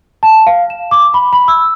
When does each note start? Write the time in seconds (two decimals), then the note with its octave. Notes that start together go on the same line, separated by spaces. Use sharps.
0.23 A5
0.47 F5
0.70 E7
0.91 D6
1.14 B5
1.33 B5
1.48 E6